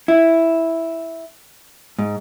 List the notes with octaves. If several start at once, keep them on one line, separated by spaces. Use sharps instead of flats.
E4
G#2